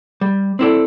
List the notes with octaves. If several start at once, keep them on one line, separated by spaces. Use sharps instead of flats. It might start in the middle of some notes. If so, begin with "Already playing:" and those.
G3
C4 E4 A4 D5